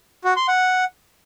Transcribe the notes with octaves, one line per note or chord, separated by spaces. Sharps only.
F#4
C6
F#5